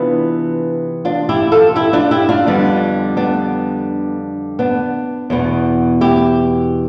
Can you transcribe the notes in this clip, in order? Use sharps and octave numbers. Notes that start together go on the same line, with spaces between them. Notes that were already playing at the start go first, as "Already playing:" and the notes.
Already playing: C3 E3 B3 D4 F4
D4 F4
E4 G4
F4 A4
E4 G4
D4 F4
E4 G4
D4 F4
F2 D3 G3 B3
B3 D4
B3 D4
E2 B2 B3
E4 G4